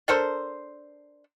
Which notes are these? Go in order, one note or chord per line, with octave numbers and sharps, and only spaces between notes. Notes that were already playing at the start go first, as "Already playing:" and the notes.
D4 A4 A#4 C5